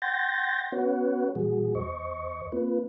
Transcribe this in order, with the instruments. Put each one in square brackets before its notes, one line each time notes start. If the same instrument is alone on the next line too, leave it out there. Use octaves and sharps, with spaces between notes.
[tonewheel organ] F#5 G5 C6 G6 A6 A#6
B3 C#4 F#4 B4 C#5 F#5
A#2 E3 G3 F#4 G#4
E2 C5 D#5 C#6
A#3 C4 F4 B4